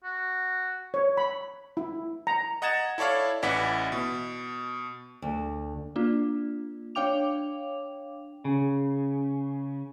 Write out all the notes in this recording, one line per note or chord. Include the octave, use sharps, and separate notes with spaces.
F#4
C#5
B5
E4
A#5
D#5 F#5 A#5 G#6 A6 E7
E4 A4 C#5 D5 F5
A1 E3 E4 D5 F#5 B6
B2
D2
A#3 D4 F4
D4 C#5 F5 G5 D6 F7
C#3